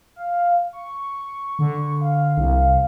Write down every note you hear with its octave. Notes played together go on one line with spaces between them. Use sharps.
F5
C#6
D3
F5
C2